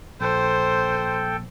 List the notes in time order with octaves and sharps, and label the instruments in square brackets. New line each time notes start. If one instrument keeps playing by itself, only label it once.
[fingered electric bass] A#1 [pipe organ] A4 G5 [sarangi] C5